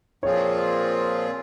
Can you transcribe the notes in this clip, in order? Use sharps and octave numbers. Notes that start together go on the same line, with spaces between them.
A#2 F3 C4 F4 G#4 C#5